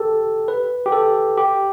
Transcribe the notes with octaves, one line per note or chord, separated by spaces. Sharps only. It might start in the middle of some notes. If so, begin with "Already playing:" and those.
Already playing: G4 A4
B4
G4
A4
G4